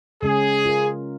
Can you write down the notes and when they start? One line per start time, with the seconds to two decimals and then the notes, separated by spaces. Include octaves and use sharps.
0.22 C#3 G#3 C#4 G#4
0.65 F4 A#4